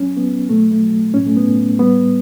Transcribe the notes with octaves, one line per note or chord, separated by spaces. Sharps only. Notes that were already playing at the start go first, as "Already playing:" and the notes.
Already playing: F#3 C#4
F#3 B3
B2 A3
A3
F#3
A2 C#4
A3
B3
A2
G3 B3